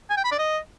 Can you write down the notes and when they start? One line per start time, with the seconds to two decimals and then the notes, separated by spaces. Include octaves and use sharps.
0.10 G#5
0.17 G5
0.24 B5
0.31 D5
0.39 D#5